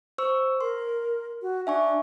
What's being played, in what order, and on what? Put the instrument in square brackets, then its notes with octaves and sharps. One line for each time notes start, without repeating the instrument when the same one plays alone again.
[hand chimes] C5 C#6 E6
[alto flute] A#4 [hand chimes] C6
[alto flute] F#4
[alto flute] D4 [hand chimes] E5 G#5 C#6